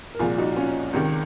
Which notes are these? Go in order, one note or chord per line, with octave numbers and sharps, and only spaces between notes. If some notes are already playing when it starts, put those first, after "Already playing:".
A#4
C2 A#2 F3 F4 G#4
D#4 F#4
C#4 F4
C#2 C3 D#3